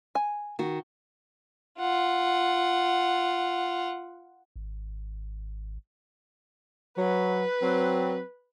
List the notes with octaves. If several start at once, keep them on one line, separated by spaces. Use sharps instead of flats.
G#5
D#3 F#4
F4 F#5
G#1
F#3 B4
F#3 C4